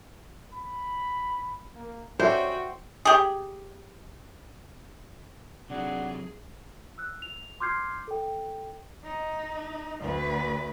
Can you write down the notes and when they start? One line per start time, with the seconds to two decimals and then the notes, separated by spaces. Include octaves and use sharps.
0.53 B5
1.75 A#3
2.20 C#4 F#4 A4 C5 D5 E5 G5
3.05 G4 G#4
5.70 C3 F#3 D4 G#4 F#5
6.98 E6 F#6
7.22 F7
7.60 C6 D6 F6 G6 G#6 C7
8.08 A4 G5
9.04 D#4
10.00 D2 B4